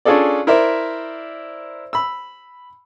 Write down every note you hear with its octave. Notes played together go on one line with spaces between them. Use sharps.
C#4 D4 F4 G#4 A4 D5
E4 A#4 C5 D5 E5
B5 E6